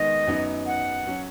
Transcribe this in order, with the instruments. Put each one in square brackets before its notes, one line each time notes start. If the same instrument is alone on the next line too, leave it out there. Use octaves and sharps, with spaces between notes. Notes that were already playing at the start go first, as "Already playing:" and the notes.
Already playing: [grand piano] D#3 G#3 B3 D#4 [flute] D#5
[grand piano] F#2 F#3 B3 D#4
[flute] F#5
[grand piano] F#3 C#4